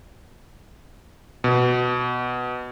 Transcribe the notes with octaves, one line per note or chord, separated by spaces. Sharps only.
B2